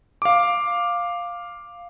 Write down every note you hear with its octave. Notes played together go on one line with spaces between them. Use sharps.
F5 D6